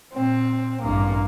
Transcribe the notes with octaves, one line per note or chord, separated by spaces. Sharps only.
A#2 C4
A1 G2 A#3